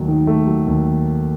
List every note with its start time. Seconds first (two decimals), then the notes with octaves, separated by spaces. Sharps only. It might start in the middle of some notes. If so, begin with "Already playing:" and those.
Already playing: D#2 F#3 A3
0.08 D#3
0.27 A3
0.47 F#3
0.66 D#2